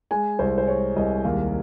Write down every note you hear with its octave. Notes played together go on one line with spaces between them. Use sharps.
G#3 G#5
C2 C5
C5
G#3 C#5
C2 D#5
D#2 F5